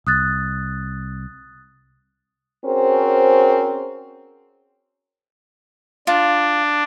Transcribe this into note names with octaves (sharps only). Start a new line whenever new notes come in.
C2 D#6 F#6 A6
C4 C#4 F#4 G#4 A#4 C5
D4 F4